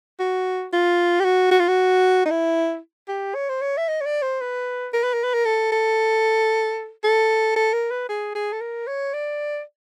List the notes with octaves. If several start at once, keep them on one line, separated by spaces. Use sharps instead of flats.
F#4
F4
G4
F#4
F#4
F4
F#4
D#4
E4
G4
C#5
C5
C#5
E5
D#5
C#5
D5
C5
B4
A#4
B4
A#4
B4
A#4
A4
A4
A4
A4
A#4
B4
G#4
G#4
A4
A#4
C#5
D5